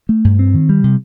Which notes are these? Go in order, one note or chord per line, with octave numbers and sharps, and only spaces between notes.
A3
G2
C4
D#3
G3
C3